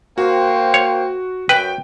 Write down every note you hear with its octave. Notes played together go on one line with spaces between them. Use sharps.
A#3 F#4 C5 G5
C#5
F#2 B4 G5